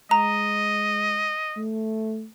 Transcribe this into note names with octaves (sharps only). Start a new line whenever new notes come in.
G#3 D#5 A#5
A3